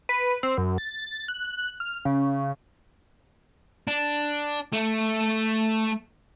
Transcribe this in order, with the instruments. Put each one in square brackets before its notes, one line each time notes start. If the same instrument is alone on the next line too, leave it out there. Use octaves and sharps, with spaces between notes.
[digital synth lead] B4
C4
F#2
A6
F#6
F6
C#3
[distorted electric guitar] D4
A3